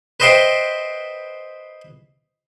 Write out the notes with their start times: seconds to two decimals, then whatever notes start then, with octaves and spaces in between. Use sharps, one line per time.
0.20 B4 C5 D#5 E5 G5 C6